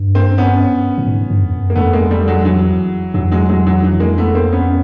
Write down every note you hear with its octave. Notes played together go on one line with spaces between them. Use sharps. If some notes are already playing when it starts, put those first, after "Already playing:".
Already playing: G2
A#3 C4
B3 C#4
A2
G#2
G2
F2
F#2
A#3
F2 A3 B3
G#3 A#3
G3 A3
F#3 G#3
E3 F#3
F2 E3 F#3
F#3 G#3
F#3 G#3
E3 F#3
E3
G#3 A#3
A3 B3
A#3 C4
B3 C#4